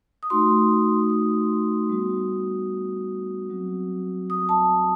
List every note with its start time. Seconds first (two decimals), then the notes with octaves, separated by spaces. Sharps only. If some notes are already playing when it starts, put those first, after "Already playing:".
0.23 D#6
0.30 A3 D#4 F#4 C6
1.00 C6
1.10 D#6
1.89 G3 B3 F#4
3.49 F#3 C4 F#4
4.30 D#6
4.49 A5